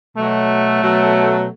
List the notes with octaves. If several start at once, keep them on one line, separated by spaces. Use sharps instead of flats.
B2 F#3 A3
B2 F#3